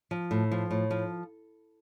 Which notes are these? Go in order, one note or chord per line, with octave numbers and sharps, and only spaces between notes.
F3
A2
F3
A2
F3